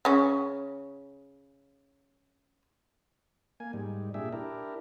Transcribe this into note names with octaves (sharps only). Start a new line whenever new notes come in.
C#3 C#4
A#3 G#5
G#2 G3
A#2 D4 G4 G#4 E5
D4 E4 G4 A#4